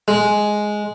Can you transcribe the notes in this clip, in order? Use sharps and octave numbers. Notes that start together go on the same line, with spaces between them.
G#3